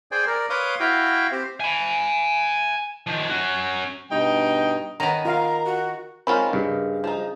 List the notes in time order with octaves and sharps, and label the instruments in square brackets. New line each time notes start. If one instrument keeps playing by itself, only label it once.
[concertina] G#4 C5 D5 G5 G#5
A#4 D5
B4 C#5 F5 C6 D6 D#6
E4 F#4 F5 G5
C4 G4 C5
[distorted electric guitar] G#5 B5
D#3 F3
C#4 F#4
[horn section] G2 B2 D#4 G5
[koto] D#3 B3 [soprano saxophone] C#4 [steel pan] A#5
[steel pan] F4 F5 [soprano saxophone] A#4 [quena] A#5
[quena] F#4
[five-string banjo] D#3 G#3 B5 [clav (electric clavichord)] C4 C#4 F4 [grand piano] A#4
[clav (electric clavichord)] G2 [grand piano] C#3
[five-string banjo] F3 D#4